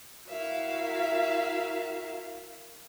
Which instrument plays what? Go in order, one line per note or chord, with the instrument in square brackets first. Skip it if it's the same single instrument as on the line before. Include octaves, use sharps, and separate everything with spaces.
[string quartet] E4 F#4 A#4 E5 F5